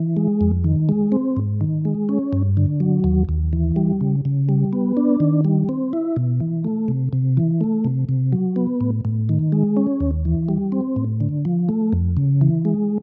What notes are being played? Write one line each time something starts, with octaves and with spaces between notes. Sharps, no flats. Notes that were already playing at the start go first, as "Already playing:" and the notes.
Already playing: E3
G#3
F2
D#3
G#3
C4
G#2
D#3
G#3
C#4
G2
D3
F#3
D#2
D#2
E3
G3
C#3
C#3
G3
B3
D4
D#3
G3
C4
E4
B2
E3
A3
C3
C3
E3
A3
C3
C3
F#3
B3
A2
A2
D#3
G#3
C#4
D#2
E3
G3
C4
A2
D3
F3
A3
F2
C#3
E3
G#3